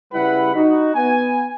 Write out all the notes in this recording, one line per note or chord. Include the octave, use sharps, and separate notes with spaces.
C#3 G3 E4 B4 F#5 B5
D#4 F#4
B3 G#5